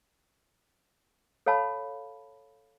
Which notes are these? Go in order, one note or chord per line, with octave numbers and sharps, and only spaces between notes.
A4 C#5 F5 A5 B5